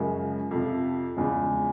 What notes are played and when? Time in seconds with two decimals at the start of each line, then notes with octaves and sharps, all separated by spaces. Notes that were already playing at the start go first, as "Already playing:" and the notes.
Already playing: F#2 C#3 F3 G#3
0.51 F2 C3 F3
1.17 E2 C#3 F3 G#3